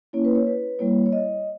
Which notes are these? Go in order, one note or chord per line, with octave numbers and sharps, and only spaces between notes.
A#3 C#4 E4 C#5
B4
C#5
B4
G3 A#3 E4 C#5
C#5
D#5